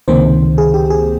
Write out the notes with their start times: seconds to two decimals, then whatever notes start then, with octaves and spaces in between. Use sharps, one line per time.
0.08 C#2 C3 D#3 A#3 C4 C5
0.58 G#4
0.74 G4
0.90 G#4